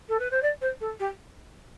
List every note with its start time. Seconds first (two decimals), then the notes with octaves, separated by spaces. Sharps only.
0.08 A4
0.19 B4
0.31 C5
0.42 D5
0.61 C5
0.80 A4
0.99 G4